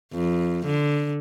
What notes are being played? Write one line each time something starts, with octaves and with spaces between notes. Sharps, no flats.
F2
D3